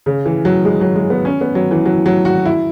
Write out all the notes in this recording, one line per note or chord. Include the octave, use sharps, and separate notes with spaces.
C#3
E3
F#3
G#3
F#3
G#3
B3
C#4
B3
F#3
E3
F#3
F#3
F#4
E4